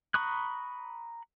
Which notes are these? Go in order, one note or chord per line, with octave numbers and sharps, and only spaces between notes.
A#5 B5 C#6 D#6 F#6